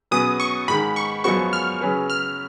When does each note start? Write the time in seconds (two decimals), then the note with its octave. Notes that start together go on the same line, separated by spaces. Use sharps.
0.11 B2 F#3 C#4 G#4 B4 D#6
0.40 C#6
0.68 G#2 D#3 G#3 B5
0.96 C#6
1.24 F#2 F3 G#3 B3 F#4 C#6
1.53 F6
1.81 C#3 F#3 C#4 G#4 B4
2.10 F6